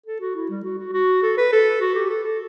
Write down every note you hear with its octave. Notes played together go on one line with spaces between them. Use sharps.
A4
F#4
E4
G3
F#4
F#4
F#4
A4
B4
A4
F#4
G4
A4
A4